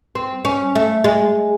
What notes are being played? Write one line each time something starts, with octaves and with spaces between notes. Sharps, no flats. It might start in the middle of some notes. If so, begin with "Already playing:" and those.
C4
C#4
A3
G#3